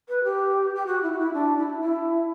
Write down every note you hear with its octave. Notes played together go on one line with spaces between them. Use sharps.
B4
G4
G4
F#4
E4
F#4
E4
D4
E4
E4